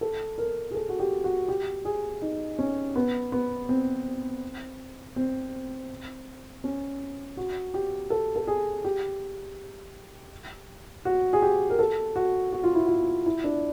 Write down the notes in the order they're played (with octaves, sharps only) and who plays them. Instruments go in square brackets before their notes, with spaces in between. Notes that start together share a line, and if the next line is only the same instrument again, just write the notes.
[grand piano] A4
A#4
G#4
A4
F#4
G4
F#4
G4
G#4
D#4
C#4
B3
B3
C4
C4
C#4
F#4
G4
A4
A4
G#4
G4
F#4
G#4
G4
A#4
A4
F#4
F#4
F4
E4
F4
E4
D4